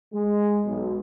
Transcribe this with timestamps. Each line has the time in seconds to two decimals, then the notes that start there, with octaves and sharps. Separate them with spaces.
0.13 G#3
0.65 B1